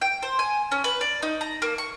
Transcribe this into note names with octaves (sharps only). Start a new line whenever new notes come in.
G5
C5
G#5
C#4
B4
D5
D#4
A#5
A#3
C#6